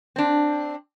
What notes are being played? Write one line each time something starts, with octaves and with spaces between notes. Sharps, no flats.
C4 D4